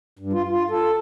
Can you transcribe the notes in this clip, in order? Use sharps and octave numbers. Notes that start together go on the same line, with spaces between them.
G2
F4
F4
A4